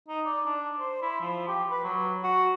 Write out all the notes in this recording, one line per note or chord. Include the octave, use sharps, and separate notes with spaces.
D#4
D5
D4
C5
E4
F3
G4
B4
F#3
F#4